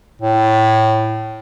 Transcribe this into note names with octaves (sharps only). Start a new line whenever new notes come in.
A2